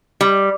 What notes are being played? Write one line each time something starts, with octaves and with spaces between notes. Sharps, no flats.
G3